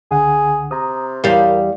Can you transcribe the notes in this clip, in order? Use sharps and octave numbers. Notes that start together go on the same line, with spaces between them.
C#2 D3 G#4 F#5
C3 A#5 D#6
E2 G3 A#4 F5